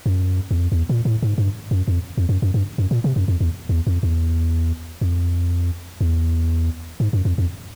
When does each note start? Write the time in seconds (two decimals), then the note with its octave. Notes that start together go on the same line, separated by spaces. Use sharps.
0.06 F#2
0.51 E2
0.56 F2
0.72 E2
0.89 A#2
1.05 A2
1.23 G#2
1.38 G2
1.71 F#2
1.88 F2
2.18 F2
2.29 F#2
2.42 F#2
2.54 G2
2.78 F#2
2.91 A#2
3.04 C3
3.16 F#2
3.28 F2
3.41 E2
3.69 E2
3.87 F2
4.03 E2
5.01 F2
6.01 E2
7.00 G#2
7.13 F#2
7.25 F2
7.38 F2